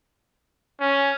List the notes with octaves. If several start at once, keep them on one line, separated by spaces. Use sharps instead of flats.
C#4